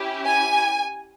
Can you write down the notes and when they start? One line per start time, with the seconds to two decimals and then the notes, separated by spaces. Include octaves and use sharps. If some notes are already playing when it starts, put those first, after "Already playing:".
Already playing: C#4 E4 G4
0.24 G#5